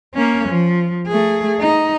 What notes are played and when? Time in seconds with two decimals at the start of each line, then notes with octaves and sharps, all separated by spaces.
0.14 A#3 C#4
0.49 F3
1.07 A3 G#4
1.60 D#4